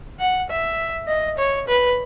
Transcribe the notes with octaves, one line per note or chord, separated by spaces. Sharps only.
F#5
E5
D#5
C#5
B4